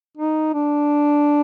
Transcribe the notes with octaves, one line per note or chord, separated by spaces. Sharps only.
D#4
D4